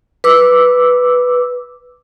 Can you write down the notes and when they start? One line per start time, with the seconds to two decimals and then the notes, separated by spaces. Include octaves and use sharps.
0.24 B4 D6 E6